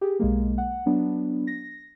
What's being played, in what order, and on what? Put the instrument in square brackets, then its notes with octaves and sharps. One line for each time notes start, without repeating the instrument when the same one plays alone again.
[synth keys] G4 G#4
B1 G#3 A#3
F#5
F#3 B3 D4
A#6